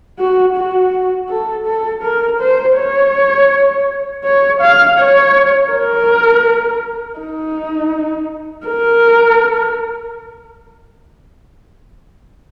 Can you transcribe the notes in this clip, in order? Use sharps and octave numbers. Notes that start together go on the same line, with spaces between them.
F#4
F#4
A4
A4
A#4
C5
C#5
C#5
F5
C#5
A#4
D#4
A#4